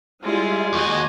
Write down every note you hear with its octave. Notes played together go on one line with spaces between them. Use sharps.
G3 G#3 E4 F4
D#2 F#4 D#5 G#5